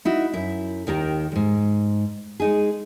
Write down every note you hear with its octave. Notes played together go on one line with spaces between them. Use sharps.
D#4 E4 F#4
F#2 E4
D#2 D#3 G4 A#4
D#2 G#2
G#3 D#4 G#4